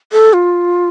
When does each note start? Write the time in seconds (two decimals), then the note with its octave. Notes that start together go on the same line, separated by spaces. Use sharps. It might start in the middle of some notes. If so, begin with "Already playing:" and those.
0.13 A4
0.33 F4